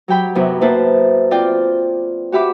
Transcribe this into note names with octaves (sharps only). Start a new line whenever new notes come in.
F#3 G4 G5 B5
F#2 C3 B3 E4
A#3 B3 E4 B4 C5 A5
C4 F4 D5 G5
F#4 G4 E5 B5 D6